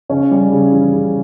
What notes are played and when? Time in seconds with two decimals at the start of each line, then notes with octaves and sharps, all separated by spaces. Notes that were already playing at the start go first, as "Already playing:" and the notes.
0.09 C#3 C#4 C#5
0.31 G3
0.52 C#3
0.72 E3
0.94 C#3